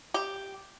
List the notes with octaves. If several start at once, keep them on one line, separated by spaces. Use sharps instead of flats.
G4